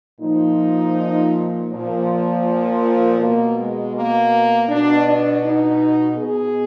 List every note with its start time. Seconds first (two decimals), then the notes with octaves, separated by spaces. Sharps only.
0.21 A#2 F3 D#4
1.70 A#2 F3
3.19 B2 A#3
3.57 G#3
3.94 A#3
4.69 B2 D4
5.06 D4
5.43 D#4
6.18 B2 G#4